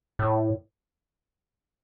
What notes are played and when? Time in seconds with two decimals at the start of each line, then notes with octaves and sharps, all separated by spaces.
0.19 A2